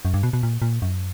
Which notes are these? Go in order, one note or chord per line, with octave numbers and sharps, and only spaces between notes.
F#2
G2
B2
B2
A#2
A#2
F#2